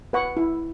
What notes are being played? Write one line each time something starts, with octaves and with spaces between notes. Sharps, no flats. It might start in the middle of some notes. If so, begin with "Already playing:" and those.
B4 F#5 C#6
E4